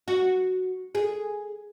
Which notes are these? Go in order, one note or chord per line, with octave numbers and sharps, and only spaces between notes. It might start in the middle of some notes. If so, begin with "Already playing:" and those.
F#4
G#4